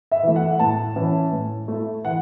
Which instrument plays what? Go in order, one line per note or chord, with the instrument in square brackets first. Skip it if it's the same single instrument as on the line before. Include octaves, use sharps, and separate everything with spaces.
[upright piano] E5
E3 A3
F#5
A2 A5
E3 C#4 E4
A2
A3 E4
E3 F#5